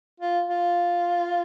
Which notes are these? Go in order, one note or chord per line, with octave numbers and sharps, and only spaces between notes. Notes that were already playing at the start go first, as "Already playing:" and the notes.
F4
F4